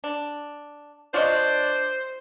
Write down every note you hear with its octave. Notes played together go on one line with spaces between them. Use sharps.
D4
D4 F4 C5 C#5 D#5